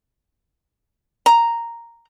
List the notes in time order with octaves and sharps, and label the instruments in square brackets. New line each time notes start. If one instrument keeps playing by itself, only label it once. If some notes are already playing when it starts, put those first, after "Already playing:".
[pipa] A#5